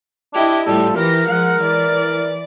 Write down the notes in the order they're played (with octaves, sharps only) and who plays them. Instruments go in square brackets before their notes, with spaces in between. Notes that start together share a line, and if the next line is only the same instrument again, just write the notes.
[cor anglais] D4 [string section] E4 G4 D#5
[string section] A2 F3 G3 [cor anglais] A4
[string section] E3 G4 A#6 [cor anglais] A#4
[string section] F3 G#3 F#5
E3 D5